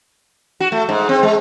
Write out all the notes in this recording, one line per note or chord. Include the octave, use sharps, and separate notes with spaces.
F#4
A3
G#2
C4
G#3